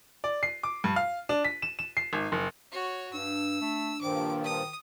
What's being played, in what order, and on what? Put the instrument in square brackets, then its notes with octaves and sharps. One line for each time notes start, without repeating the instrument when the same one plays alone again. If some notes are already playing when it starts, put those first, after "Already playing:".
[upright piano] D5
C7
D6
G2
F5
D4
B6
E7
E7
C7
G#1
F#1
[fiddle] F#4 C#5
[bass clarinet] G2 [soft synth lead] D4 [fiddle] E6
[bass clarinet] A3
[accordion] G2 A#2 F3 [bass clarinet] D#3 [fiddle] D6
[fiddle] D#6